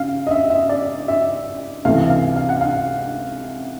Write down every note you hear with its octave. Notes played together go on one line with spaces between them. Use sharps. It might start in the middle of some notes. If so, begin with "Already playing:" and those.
Already playing: C#3 F5
D#5
E5
E5
D5
E5
C#2 C3 E3 A3 F5
F5
F5
F#5
F5